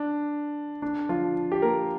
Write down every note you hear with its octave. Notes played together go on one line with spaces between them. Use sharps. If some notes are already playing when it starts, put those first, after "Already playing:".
Already playing: D4
D4
F3 F4
G4
A#3 A#4